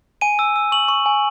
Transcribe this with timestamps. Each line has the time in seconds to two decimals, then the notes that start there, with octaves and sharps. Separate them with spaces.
0.21 G#5 D#7
0.39 E6
0.56 E6
0.72 C#6 F#7
0.88 C#6
1.06 G#5